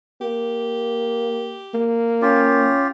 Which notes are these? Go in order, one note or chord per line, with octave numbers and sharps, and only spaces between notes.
A#3 G4
A#3
C#4 F4 G4